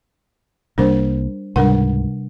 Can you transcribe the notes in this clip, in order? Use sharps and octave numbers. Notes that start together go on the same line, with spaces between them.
C2 C3 G3 A#3 D4 A#4 C5
C#2 G#2 C3 G3 D4 A#4 F#5